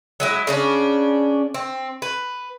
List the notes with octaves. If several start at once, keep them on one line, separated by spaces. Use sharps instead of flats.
F#3 G#3 E4
C#3 C#4 D4
C4
B4